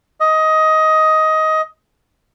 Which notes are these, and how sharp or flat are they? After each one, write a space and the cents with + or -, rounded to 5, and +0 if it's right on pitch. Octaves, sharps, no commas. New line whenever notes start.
D#5 +15